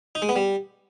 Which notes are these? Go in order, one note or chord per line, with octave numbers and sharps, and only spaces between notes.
D#4
G#3
B3
G3